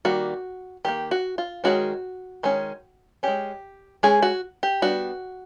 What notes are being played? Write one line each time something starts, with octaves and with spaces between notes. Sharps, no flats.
D#3 G3 A#3 F#4
D#3 G3 A#3 G4
F#4
F4
D#3 G#3 C#4 F#4
D#3 G#3 C#4
G#3 C#4 G4
G#3 C#4 G#4
F#4
G4
G3 B3 D4 F#4